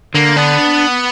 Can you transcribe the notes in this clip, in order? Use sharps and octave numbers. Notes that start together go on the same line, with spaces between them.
D3 A#3
B3 D4